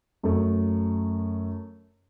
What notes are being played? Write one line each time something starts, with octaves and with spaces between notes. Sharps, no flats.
F#2 A3